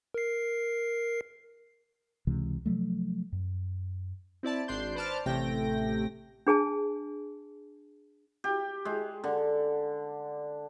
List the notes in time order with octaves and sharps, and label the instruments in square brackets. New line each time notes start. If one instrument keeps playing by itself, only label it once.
[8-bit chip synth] A#4 C7
[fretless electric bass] C#2 C3 E3 G#3
C3 F3 F#3 A3
F#2
[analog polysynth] C4 E4 D5 A5
G#1 D4 C6 G6
B4 C5 D5 A5 D6 F6
A1 C3 A3 G5 A#6
[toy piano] D4 G#4 G#5 A5
[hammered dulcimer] G4
G#3
D3